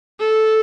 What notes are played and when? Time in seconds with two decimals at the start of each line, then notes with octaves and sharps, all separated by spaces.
0.20 A4